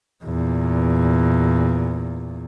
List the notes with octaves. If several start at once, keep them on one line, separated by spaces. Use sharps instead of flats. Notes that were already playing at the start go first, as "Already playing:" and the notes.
E2 A#2